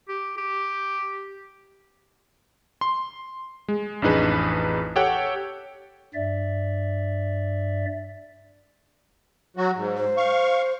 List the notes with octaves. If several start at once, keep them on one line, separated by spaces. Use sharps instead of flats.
G4
G4
C6
G#3
A1 F2 D4 D#4 G#4 B4
G4 A4 C#5 F#5 G5
G2 D5 E5
F#3 F#4
G#2
C5
F5 C#6